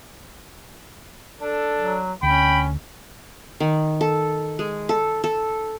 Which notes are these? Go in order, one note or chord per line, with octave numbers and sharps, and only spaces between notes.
D4 A4
F#3
D2 C#4 G5 B5
D#3
A4
G#3
A4
A4